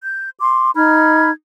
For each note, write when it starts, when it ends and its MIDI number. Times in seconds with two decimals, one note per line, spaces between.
0.02 0.30 91
0.40 0.71 84
0.40 0.71 86
0.75 1.30 63
0.75 1.30 83
0.75 1.30 89
0.75 1.30 92